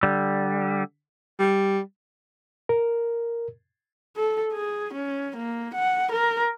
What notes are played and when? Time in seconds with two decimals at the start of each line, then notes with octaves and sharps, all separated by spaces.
0.03 D3 G3
1.39 G3
2.69 A#4
4.16 A4
4.53 G#4
4.94 C#4
5.37 A#3
5.74 F#5
6.12 A#4